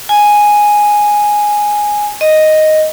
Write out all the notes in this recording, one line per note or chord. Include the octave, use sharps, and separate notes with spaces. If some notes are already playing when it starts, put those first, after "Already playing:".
G#5
D#5